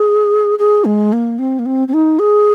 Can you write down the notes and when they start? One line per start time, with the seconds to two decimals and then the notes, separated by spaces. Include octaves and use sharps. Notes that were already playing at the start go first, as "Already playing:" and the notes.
Already playing: G#4
0.59 G#4
0.85 G#3
1.13 A#3
1.39 C4
1.59 A#3
1.66 C4
1.88 C4
1.94 D#4
2.19 G#4